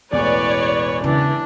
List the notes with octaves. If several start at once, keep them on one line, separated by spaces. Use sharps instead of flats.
E1 A1 E2 B4 C#5 D5
C#3 E3 D4